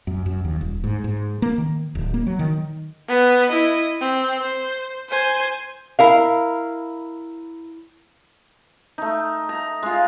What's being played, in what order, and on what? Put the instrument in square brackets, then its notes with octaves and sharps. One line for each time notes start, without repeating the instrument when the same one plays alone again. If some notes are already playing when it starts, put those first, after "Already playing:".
[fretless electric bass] F#2
F#2
D#2
D#1
G#2
G#2
A#3
D#3
D1
A#3
F#3
D#3
[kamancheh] B3
E4 D#5
C4
C5
C5 G#5
[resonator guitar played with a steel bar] E4 A#4 F5
[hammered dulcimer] A3 D#4
A#5
G#3 F4